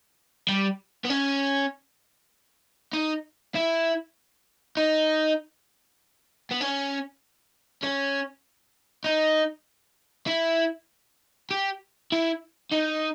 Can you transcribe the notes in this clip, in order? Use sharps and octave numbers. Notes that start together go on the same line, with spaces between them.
G3
B3
C#4
D#4
E4
D#4
B3
C#4
C#4
D#4
E4
G4
E4
D#4